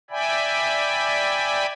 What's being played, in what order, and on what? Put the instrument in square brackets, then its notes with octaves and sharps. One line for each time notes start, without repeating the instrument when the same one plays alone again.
[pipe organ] D5 E5 G5 G#5 B5